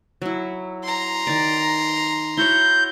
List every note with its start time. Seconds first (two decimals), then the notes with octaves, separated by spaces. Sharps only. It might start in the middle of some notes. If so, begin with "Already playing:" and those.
0.22 F#3 E4
0.84 A#5 C6
1.27 D#3 D5
2.37 E4 F#4 C#5 G6